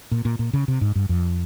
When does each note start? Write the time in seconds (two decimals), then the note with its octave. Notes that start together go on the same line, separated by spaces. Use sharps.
0.11 A#2
0.25 A#2
0.39 A#2
0.53 C#3
0.68 C3
0.81 G#2
0.96 G2
1.09 F2